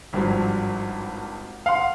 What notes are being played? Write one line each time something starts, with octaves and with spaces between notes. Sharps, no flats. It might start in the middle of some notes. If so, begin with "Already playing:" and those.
G#1 G2 F3 F#3
F5 F#5 C6